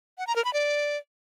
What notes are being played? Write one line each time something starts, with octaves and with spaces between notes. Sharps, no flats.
F#5
A#5
A#4
B5
D5